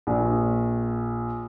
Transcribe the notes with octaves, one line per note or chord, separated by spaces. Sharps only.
A#1